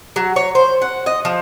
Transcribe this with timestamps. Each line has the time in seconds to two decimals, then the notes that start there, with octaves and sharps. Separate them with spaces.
0.16 F#3
0.36 C#5
0.55 C5
0.82 F#5
1.06 D#5
1.25 F3